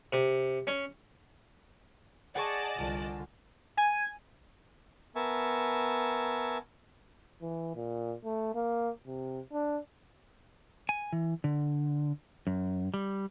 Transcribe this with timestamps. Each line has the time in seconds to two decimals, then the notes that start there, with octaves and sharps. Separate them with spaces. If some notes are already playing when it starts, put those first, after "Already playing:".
0.13 C3
0.67 C#4
2.35 G#4 D5 D#5 F#5 G#5 A5 C#6
2.76 C2 D3 F4
3.77 G#5
5.16 B3 A#4 E5 G#5 A5 C#6
7.42 E3
7.75 A#2
8.25 A3
8.55 A#3
9.06 C3
9.53 D4
10.89 G#5
11.13 E3
11.44 D3
12.47 F#2
12.94 G3